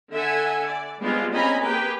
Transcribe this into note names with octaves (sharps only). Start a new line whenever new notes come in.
D3 A4 E5 F#5 G#5
D5
G3 G#3 B3 C4 D4 F4
C4 C#4 D#5 G#5 A#5 B5
A#3 G4 G#4 B4 G5